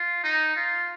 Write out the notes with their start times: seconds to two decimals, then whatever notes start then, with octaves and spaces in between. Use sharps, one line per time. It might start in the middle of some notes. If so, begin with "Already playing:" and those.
Already playing: F4
0.23 D#4
0.56 F4